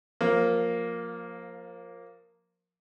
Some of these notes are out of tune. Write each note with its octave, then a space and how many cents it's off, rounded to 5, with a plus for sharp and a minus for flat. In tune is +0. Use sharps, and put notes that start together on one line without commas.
F3 +25 A#3 +0